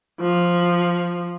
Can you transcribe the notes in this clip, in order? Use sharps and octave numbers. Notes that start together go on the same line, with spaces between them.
F3